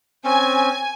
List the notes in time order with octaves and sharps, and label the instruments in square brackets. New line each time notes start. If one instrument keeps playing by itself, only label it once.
[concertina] C4 C#4 [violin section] G#5